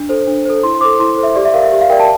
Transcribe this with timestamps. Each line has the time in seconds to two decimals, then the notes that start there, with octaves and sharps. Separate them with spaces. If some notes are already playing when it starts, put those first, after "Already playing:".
Already playing: D4
0.09 A4 C5
0.27 D4
0.45 A4 C5
0.63 E4 C6
0.75 C6
0.81 A4 C5 D6
0.99 E4 C6
1.17 A4 C5
1.23 E5
1.35 G4 D5
1.45 E5
1.54 A#4 F5
1.57 D5
1.62 E5
1.72 G4
1.81 F5
1.90 A#4 D5 G5
2.00 A5